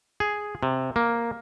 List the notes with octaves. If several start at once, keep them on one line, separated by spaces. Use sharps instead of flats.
G#4
C3
A#3